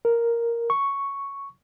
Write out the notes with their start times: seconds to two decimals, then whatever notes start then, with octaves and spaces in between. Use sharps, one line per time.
0.05 A#4
0.70 C#6